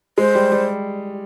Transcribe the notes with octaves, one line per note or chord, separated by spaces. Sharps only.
G#3 C5
G3
G3